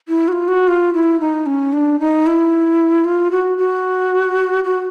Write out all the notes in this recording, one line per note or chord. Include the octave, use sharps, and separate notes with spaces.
E4
F#4
F4
F#4
F4
E4
D#4
C#4
D4
D#4
E4
F4
F#4
F#4
F#4